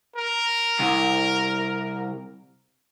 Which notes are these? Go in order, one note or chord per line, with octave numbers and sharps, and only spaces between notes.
A#4
C2